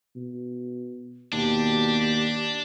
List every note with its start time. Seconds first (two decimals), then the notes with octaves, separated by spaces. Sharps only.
0.16 B2
1.33 D#2 B2 D4 G4